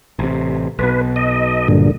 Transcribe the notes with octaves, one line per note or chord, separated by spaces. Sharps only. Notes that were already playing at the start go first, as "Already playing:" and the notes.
A1 C3
B1 B2 B4
D#5
G2 A#2 D3